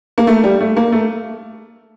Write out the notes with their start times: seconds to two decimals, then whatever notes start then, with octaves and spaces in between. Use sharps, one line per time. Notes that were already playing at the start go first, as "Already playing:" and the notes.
0.18 A#3
0.27 A3
0.44 G3
0.61 A3
0.77 A#3
0.92 A3